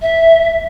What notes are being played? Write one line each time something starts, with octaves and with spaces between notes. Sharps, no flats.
E5